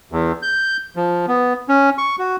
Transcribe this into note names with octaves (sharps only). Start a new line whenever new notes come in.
E2
G6
F3
B3
C#4
C#6
F#4